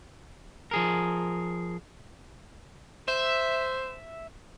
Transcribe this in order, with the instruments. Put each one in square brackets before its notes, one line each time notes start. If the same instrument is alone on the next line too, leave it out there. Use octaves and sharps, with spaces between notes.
[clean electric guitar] F3 G#4 A#4
[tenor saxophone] C5 [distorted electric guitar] E5